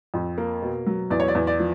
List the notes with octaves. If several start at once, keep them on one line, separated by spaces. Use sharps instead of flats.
F2
A#3
B2
F#3
E2 D5
C#5
D5
E2
D5
F3